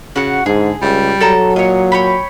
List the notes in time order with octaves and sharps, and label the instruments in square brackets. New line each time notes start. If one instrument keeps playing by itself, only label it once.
[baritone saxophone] C#3 [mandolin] F#4 F#5
[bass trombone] G#2 [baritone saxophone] D3 [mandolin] G#4
[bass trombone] C#2 [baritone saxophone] G3
[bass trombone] F#3 [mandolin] A4 A5 A#5
[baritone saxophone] A#2 [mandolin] C#5 D#5
[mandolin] C#5 G5 B5